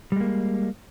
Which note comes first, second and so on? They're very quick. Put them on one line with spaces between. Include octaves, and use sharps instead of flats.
G3 G#3 A#3